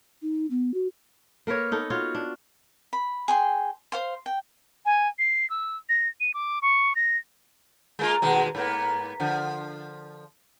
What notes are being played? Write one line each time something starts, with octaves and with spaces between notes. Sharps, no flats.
D#4
B3
F#4
A#3 A#4 B4 C#5
B3 D#4 A4
F4 F#4 C#5
D4
B5
G#4 G5 C6
C5 F5 C6
G5
G#5
C7
E6
A#6
D#7
D6
C#6
A#6
G#3 A#3 F4
D#2 B2 G#3
G#2 A#3 B3
D3 F3